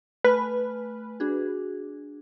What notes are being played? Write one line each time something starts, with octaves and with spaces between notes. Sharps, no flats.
A3 B4 G#5 F6
D4 F#4 G#4